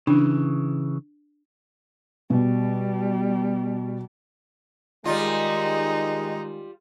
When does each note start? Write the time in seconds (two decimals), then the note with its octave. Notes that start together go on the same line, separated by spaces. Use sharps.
0.07 C#3 E3 D4
2.30 B2 G3
5.05 D#3 G3 G#3 D#4 F4